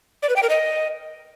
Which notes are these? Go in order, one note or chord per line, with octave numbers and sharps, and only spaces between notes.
D5
B4
G5
A#4
D#5